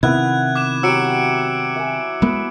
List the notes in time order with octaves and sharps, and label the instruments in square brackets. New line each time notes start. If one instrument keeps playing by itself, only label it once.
[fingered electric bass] C3 D#3 [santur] B3 E4 [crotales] F#6 G#6
[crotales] D6 F#6 E7
[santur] F#3 G4 [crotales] E6 C#7 D7
[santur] E5 G#5
[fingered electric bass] G#3 B3 [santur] B4